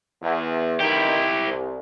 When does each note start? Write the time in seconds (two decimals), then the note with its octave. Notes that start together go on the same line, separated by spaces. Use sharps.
0.22 E2
0.80 A1 D#3 D#4 E4 G4
1.46 C2